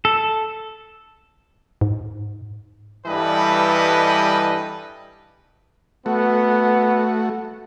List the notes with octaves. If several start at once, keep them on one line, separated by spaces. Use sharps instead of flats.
A4
G#2
G2 E3 G3 A4 B4 D#5
A3 B3 F#4